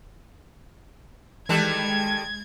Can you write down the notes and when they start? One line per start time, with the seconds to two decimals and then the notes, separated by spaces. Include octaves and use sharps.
1.49 D#3 E3 G3 G#3 A4 F#6 G#6 A6